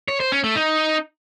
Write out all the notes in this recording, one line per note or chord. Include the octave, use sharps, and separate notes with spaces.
C#5
C5
C#4
A3
D#4